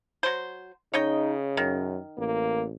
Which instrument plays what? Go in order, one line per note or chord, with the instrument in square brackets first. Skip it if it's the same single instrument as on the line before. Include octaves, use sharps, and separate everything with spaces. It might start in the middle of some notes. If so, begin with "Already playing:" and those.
[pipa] F#3 C5
[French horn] C#3 [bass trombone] D#4 [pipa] C#5 D#5 G5
[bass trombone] F#2 [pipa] D#3
[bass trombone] A1 [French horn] A#3